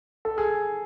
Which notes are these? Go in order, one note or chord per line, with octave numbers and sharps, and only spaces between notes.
A4
G#4